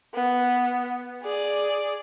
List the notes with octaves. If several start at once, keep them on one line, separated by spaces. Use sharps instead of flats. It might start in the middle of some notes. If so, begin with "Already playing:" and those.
B3
G#4 D5